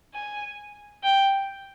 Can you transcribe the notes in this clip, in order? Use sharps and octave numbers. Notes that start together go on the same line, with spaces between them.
G#5
G5